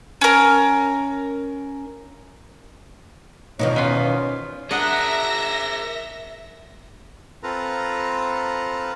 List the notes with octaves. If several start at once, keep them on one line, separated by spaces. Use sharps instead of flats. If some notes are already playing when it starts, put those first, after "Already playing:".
C#4 A#4
E2 B2 D#3 F3 D#4 C#5
B3 C#4 F4
D4 G#4 A#4 D#5 E5 F#5 A#6
C4 F4 A4 B4 A#5